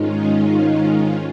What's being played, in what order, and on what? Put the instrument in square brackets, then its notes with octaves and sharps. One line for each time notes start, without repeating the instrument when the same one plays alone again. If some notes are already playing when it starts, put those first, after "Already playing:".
Already playing: [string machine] G#2 D#3 G#3 C#4 F4 [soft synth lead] D#4